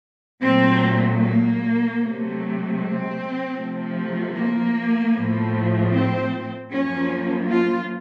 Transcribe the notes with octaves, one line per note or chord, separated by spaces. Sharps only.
A#2 F#3 A3 C4
A#3
C3 F#3 A3
C4
C3 F3 A3
A#3
A2 F3 A3
C4
F#2 F3 A#3 C#4
F4